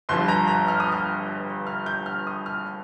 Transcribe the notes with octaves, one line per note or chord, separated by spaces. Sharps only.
G1 G2 F3 C6
A#5
A#5
F6
D#6
F6
F6
G6
F6
D#6
F6